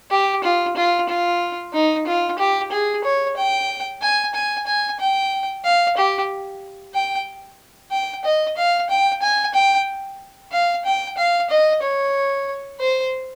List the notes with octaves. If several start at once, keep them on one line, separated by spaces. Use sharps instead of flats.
G4
F4
F4
F4
D#4
F4
G4
G#4
C#5
G5
G#5
G#5
G#5
G5
F5
G4
G5
G5
D#5
F5
G5
G#5
G5
F5
G5
F5
D#5
C#5
C5